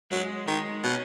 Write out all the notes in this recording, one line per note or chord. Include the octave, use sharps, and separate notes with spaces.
F#3 G#3
D#3 G#3
B2 C#4